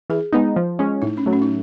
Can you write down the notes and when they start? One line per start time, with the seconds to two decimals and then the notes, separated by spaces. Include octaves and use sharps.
0.10 E3 G#4
0.33 G#3 B3 D#4
0.56 F3
0.79 G#3 C#4
1.02 A2 D#4
1.17 C#4
1.26 F#3 A3
1.33 C#4
1.42 D#4